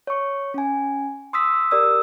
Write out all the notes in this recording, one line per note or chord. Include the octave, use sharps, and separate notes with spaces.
C#5 C#6
C#4 G#5
C6 D#6 E6 B6
G4 A#4 D5 D#6 E6